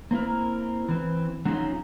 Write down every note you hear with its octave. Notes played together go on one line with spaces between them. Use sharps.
A#3 C4 E4 A#4
E3 C4
F#3 C4 C#4 D#4 F4 G#4